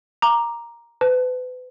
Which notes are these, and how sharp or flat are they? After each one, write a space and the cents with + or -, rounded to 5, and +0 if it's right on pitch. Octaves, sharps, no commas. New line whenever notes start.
A#5 +5 D6 +10
B4 +35 A5 +0